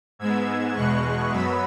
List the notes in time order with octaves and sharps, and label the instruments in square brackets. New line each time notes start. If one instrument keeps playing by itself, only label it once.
[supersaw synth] G#2 G#3 B3 E6 G#6
E2 B2 G#3 C#6 F#6
F#2 F#3 B3 B5 E6